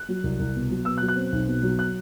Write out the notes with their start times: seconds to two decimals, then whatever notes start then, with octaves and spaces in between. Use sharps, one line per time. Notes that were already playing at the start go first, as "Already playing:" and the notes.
Already playing: F#6
0.09 F#3
0.24 C2
0.39 C2
0.55 B2
0.70 F#3
0.85 B2 E6
0.97 F#6
1.02 F#3
1.08 F#6
1.16 C4
1.32 B1
1.47 B2
1.63 F#3
1.79 F#6